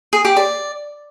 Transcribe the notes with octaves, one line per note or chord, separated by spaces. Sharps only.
G#4
G4
D5